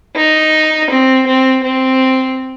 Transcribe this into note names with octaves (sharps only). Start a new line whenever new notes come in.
D#4
C4
C4
C4